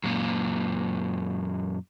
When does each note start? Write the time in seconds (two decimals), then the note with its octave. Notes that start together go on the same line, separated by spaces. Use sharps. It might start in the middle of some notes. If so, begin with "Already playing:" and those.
0.04 F#2 A#2